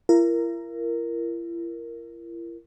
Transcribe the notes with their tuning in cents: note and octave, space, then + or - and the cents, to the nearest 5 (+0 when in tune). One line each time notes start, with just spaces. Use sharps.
E4 +45 A#4 +0